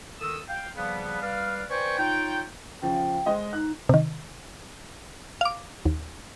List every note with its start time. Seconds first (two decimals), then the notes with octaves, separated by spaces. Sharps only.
0.20 D#3 A4 D#6 E6
0.48 F5 G5
0.76 C#3 F3 G3 A#3 B3
1.21 G3 B4 D5 F5
1.69 B4 C5 D5 G5 G#5 C#6
1.98 D#4 F4 C#5 G5
2.82 C#3 F3 G5
3.26 G#3 C5 D#5
3.53 D#4 F#6
3.89 C3 D#3
5.41 F5 D6
5.85 D#2